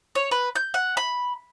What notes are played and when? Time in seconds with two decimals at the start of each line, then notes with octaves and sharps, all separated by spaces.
0.15 C#5
0.31 B4
0.56 G6
0.74 F#5
0.97 B5